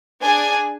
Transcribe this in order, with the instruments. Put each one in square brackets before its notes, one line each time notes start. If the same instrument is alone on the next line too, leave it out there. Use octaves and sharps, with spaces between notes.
[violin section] D4 G#4 G#5